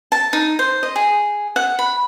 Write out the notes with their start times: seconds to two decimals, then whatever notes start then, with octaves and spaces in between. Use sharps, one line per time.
0.12 A5
0.33 D#4
0.59 C5
0.83 D#5
0.96 G#4
1.56 F#5
1.79 B5